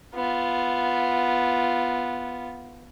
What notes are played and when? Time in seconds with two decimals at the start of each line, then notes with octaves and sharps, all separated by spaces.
0.15 B3 F4